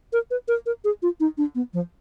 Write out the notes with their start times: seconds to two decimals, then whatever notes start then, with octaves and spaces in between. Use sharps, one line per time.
0.13 A#4
0.31 B4
0.48 A#4
0.66 A#4
0.84 G#4
1.02 F4
1.20 D#4
1.38 D4
1.55 B3
1.74 F3